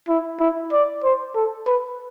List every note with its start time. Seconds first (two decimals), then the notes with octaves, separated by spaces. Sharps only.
0.09 E4
0.40 E4
0.72 D5
1.04 C5
1.35 A4
1.66 B4